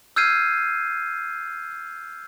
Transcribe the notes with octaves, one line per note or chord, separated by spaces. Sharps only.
E6 F6 G6 G#6 C7 D#7